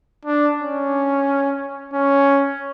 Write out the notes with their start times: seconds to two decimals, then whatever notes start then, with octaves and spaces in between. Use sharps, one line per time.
0.25 D4
0.59 C#4
1.94 C#4